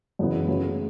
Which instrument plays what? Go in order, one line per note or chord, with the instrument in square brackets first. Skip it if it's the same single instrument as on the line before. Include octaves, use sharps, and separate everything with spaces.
[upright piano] F#2 C#3 E3 B3
C#3 F#3 A3